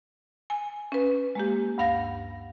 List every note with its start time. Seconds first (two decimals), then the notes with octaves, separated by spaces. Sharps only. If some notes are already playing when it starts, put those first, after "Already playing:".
0.50 G#5
0.92 C#4 B4
1.35 G#3 A#3 G4
1.78 D2 G2 F5 F#5 A#6